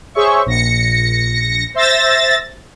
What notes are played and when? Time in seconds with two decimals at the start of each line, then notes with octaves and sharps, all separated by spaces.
0.14 G#4 C5 C#5 E5 C#6
0.46 A#1 A#6 C#7
1.74 C5 E5 E6 A6 A#6